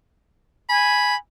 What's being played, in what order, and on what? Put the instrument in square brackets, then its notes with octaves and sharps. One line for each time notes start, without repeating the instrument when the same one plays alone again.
[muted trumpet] G#5 [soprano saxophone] B5